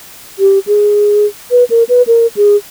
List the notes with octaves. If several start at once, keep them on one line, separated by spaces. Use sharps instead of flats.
G4
G#4
B4
A#4
B4
A#4
G#4